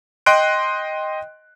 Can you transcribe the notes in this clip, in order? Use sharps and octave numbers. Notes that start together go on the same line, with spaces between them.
D#5 G5 C6 F#6 D7